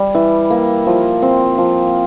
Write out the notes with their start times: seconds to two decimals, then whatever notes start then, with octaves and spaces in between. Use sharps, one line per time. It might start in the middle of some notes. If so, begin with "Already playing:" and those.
Already playing: G3
0.15 E3
0.50 A#3
0.86 F3
1.22 C4
1.58 F3